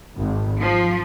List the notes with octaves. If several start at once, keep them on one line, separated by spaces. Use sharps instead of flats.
G#1
F3